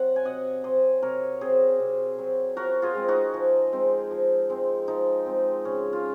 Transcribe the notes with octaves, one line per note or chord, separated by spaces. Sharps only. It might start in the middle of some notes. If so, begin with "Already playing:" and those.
Already playing: F#3 C4 F#5
G#5
C3 D#5 F#5
F#3 C4 C5 D#5
C3 A#4 C#5
F#3 C4 G#4 C5
C3
F#3 C4
F3 F#4 A#4
F4 G#4
G#3 C4
D#4 F#4
F3
G#3 C4
F3
G#3 C4
F3 D#4
G#3 C4
C#3 C#4
F4